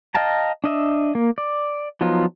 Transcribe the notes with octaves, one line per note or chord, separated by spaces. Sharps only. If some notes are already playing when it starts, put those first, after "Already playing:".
D#5 F5 G5 A5 A#5
D4 D#5 E5
A#3
D5
F3 F#3 B3 D#4 F4